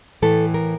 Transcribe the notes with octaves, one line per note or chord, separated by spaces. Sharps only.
A2 E3 A3 A4
A#4